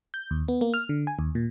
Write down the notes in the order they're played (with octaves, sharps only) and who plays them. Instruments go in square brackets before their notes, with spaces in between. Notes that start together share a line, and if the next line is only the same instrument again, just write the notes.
[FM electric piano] G6
D#2
B3
A#3
F6
D3
G#5
D#2
A#2